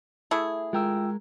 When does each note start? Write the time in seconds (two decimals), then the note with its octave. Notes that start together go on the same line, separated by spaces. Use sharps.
0.31 A3 E4 G#4
0.73 G#3 F4 A#4 G5 E6